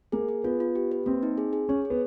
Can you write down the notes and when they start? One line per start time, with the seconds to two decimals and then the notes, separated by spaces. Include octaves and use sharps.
0.12 A#3 G#4
0.29 G#4
0.44 B3 F4
0.60 F4
0.75 G4
0.92 B4
1.06 A#3 C4
1.23 D#4
1.38 G#4
1.53 G#4
1.69 C#4 C#5
1.85 G#4
1.90 B3